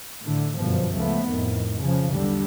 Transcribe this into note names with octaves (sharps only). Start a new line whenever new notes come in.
A2 D3
G1 F#2 B2 F3
C#2 F3 A3 B3
F2 A2 D#3
C#3 F3
B1 E2 D3 G3